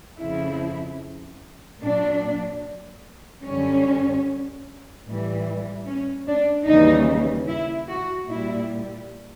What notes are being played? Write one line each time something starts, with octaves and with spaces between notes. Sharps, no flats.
F2 C#3 F3 E4
A#2 F#3 D4
F#2 D3 G3 C#4
A2 E3 G3
C#4
D4
D#2 C#3 E3 G3 D#4
E4
F#4
A#2 G3 E4